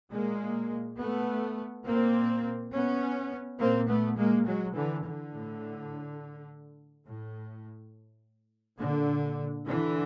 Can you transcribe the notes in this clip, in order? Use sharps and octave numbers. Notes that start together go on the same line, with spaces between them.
A#2 G#3 A#3
A3 B3
A#2 A#3 C4
B3 C#4
A#2 A#3 C4
A3 B3
G#3 A#3
F#3 G#3
D3 E3
D3
A2
A2
A#2 D3
D3 E3